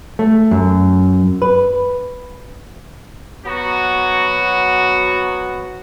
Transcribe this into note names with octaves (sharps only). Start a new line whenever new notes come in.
A3
F#2
B4
F#3 B3 F#4